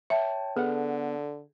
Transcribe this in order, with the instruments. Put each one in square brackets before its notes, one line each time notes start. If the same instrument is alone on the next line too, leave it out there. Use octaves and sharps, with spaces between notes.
[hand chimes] C#5 G5 A5 [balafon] E5
[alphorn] D3 [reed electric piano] B3 F#5 [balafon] G#4 [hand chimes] A4